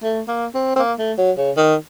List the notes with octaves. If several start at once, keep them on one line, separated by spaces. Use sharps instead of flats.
A3
A#3
C4
C4
A#3
A3
F#3
C#3
D#3